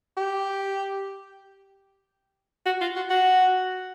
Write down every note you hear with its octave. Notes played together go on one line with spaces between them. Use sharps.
G4
F#4
F4
F#4
F#4